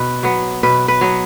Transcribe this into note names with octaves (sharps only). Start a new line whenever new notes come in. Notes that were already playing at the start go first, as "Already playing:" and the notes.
Already playing: B2 B4
F#3 B3
B2 B4
B4
F#3 B3